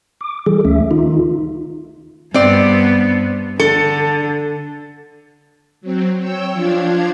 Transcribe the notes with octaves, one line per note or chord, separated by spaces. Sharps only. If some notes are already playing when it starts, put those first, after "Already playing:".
D6
E3 G3 G#4 A4
D2 A3 C#4 E5
D#3 D#4 F4
G2 B3 C4 D5
D3 A4
F#3 C4
C#5 G5 E6
F3 D4 F4 G#6